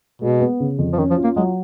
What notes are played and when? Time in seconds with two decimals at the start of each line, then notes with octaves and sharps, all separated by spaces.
0.22 B2 G#3
0.41 B3
0.60 C#3
0.79 F2
0.93 F3
0.98 D#3 C#4
1.10 F3
1.18 F4
1.24 A#3
1.36 F#3 G#3